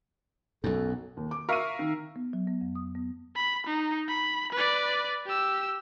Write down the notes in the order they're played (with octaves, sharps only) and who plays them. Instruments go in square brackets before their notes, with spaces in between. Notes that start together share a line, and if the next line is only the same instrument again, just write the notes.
[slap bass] B1 F#2 [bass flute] A4
[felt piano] D#2
D6
[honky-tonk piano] A#4 E5 F5 [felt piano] C#6 D#7
[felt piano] D#3
[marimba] B3
F#3
B3
F2
D#6
B3
[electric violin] B5
D#4
B5
B4 D5
G4 E6